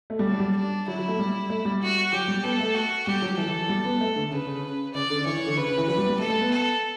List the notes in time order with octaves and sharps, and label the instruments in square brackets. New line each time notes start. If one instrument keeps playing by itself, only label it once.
[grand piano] A3
G3
[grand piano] F#3 [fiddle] D4
[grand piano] G3
[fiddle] D4
[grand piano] F#3 [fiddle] E4
[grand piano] F#3
A3
G3
A3
G3
[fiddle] F#4
[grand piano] F#3 [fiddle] G4
[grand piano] G3
[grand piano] B3 [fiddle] A4
[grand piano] A3
[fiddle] F#4
[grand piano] G3 [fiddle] G4
[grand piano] F#3
[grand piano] E3 [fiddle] A4
[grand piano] E3
F#3
G3
B3
A3
D3
[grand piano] C#3 [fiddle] B4
[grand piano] C#3
[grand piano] C#3 [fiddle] D5
[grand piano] D3
[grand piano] E3 [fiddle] C#5
[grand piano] E3
D3
[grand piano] C#3 [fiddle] B4
[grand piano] C#3
E3
[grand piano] F#3 [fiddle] B4
[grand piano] G3
G3
[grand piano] A3 [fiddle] A4
[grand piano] A3
B3
[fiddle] A4